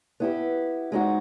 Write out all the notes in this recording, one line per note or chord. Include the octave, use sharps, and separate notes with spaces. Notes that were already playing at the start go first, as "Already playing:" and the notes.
B3 E4 G4
G#3 C4 D#4 F#4